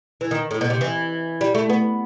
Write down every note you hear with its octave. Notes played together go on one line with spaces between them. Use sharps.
E3
D#3
A2
B2
C3
E3
G3
A3
B3